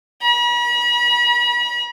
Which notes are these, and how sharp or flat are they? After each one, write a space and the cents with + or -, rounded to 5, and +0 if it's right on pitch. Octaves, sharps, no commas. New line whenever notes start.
B5 -45